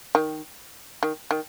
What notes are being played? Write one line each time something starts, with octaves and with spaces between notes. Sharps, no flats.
D#3
D#3
D#3